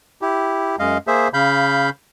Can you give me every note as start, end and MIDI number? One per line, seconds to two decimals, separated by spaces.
0.22 0.76 64
0.22 0.76 67
0.79 0.98 42
0.79 0.98 56
0.79 0.98 75
0.79 0.98 77
1.07 1.28 58
1.07 1.28 68
1.07 1.28 72
1.07 1.28 76
1.34 1.90 49
1.34 1.90 77
1.34 1.90 83
1.34 1.90 91